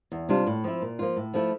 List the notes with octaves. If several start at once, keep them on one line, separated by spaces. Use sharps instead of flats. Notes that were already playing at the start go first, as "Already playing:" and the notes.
E2
C3 G3 D4 F4
A2
F3 C4 E4
A#2
F3 A#3 F4
A2
F3 A3 E4